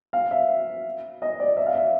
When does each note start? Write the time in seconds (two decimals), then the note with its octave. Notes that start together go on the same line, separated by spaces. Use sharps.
0.13 F5
0.31 E5
1.22 D#5
1.40 D5
1.57 E5
1.66 F5
1.75 E5